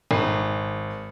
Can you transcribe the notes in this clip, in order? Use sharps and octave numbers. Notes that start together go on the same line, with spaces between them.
G#1